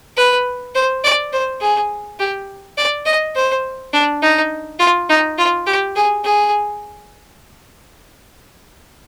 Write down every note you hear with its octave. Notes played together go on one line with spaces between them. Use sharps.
B4
C5
D5
C5
G#4
G4
D5
D#5
C5
D4
D#4
F4
D#4
F4
G4
G#4
G#4